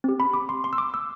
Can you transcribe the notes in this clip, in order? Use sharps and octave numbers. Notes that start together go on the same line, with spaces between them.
C4 G4
B5
D6
C6
C6
E6
D6
E6